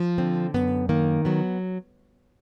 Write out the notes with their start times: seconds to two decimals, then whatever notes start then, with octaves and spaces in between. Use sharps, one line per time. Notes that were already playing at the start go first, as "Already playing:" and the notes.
Already playing: F3
0.18 D3 C4
0.54 F#2 B3
0.89 D#3 A#3
1.25 F#3 B3